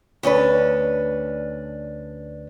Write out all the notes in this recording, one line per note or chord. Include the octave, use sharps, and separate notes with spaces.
D2 C#4 D4 B4